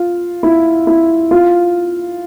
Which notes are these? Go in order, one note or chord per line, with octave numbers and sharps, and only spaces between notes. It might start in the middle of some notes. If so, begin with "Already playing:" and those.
Already playing: F4
E4
E4
F4